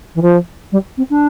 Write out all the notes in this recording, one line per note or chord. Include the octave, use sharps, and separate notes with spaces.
E3
F3
G3
C4
D4